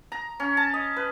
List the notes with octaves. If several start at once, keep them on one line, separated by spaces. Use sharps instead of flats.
A#5
C#4
A5
D#5
B4